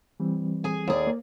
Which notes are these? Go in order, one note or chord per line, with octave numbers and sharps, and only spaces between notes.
E3 G3 C4
G#4 G#5
D#2 G#4 D5
A#3